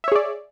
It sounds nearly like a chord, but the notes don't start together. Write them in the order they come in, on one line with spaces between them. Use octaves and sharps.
E5 C#5 G#4 D5